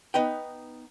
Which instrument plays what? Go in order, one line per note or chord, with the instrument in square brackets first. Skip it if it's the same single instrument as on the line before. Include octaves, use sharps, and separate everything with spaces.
[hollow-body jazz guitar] B3 D#4 B4 G5